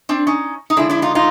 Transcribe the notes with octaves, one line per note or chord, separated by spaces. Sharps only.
C4 D4
C#4 D#4
D#4
D3 F3 G#3 D4 E4
D4 E4
D#4 F4
D#4 F4